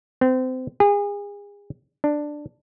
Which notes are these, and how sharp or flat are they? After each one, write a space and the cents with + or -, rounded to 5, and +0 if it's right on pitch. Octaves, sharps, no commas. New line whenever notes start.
C4 -30
G#4 -35
D4 +10